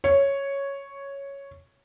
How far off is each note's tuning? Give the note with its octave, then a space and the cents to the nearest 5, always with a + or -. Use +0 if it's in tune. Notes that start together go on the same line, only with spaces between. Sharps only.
C#5 +0